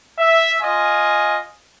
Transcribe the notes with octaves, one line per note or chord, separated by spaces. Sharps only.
E5
F4 D#5 G#5